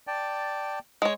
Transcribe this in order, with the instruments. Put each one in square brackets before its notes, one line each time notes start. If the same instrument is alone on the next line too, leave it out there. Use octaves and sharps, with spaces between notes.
[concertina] D5 G5 A5
[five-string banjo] G#3 C#5